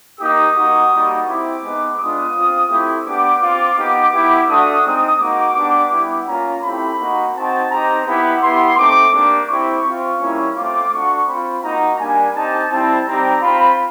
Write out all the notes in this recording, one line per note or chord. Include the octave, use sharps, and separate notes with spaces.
A#3 D#4 G4 D#6
A#3 D#4 F#4
G3 A#3 D#4 F#4
C4 E4 G4 D6
G#3 B3 D#4
G#3 B3 D4 F4 D#6
C4 F4
A3 C4 E4 G4
B3 D4 G4 D6
C4 F4 D6
B3 D#4 G4 D6
B3 E4 G4
A3 D4 F#4 D#6
G#3 C4 D#4 D#6
A#3 D#4 F#4 D6
B3 D4 G4
G3 B3 E4 G4
A#3 C#4 F4 A#5
A3 C4 E4 G4 B5
A#3 D#4 F#4
C4 D#4 F#4 A5
C4 D#4 G4 A#5
B3 E4 G4 B5
B3 E4 G4 C6
A3 C4 D#4 D6
A#3 D4 G4 D6
C4 E4 G4 C#6
C4 F4
G3 A#3 C#4 E4
A3 C4 F4 D6
A3 D4 F#4 C#6
C4 F4 B5
A#3 D#4 F#4 A#5
G3 A#3 D4 G#5
C4 D#4 G4 A5
G3 C4 E4 A5
G3 C4 D#4 G4 A#5
C4 F4 B5